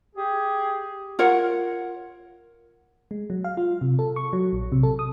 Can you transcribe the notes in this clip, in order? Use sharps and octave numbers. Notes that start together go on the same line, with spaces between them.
G4 G#4
F4 A#4 C#5 F#5
G#3
F#3
F5
F4
C3
A4
C#6
F#3
A#1
C3
A4
D#6